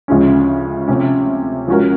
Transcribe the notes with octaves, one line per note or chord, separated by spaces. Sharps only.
D2 C#3 F3 G#3 C#4
C3 F3 A3 C#4
F3 G#3 C#4 F#4 A#4